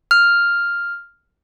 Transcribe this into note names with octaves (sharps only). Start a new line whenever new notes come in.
F6